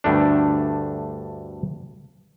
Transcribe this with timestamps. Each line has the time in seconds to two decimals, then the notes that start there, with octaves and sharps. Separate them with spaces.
0.04 D2 G2 A3 D4